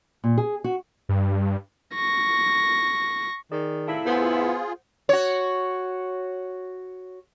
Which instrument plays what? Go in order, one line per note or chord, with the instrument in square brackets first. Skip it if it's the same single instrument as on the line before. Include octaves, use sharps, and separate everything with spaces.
[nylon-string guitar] A#2
G#4
F#4
[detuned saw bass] G2
[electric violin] C#6 A#6
[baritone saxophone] D#3 [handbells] G#4 D5
[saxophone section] A2 C3 E4 [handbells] A4 F5 A5
[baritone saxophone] B3 [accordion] F4 G#4 [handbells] C5 F#5
[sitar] F#4 C#5